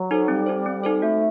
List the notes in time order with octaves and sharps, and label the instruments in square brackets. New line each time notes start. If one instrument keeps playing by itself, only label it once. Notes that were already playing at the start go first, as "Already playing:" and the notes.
Already playing: [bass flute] F#3
[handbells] D#4 A4 C5
[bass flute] G3 [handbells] C4
[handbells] D#4 A4 C5
C4
D#4 A4 C5
[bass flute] A3 [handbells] F#4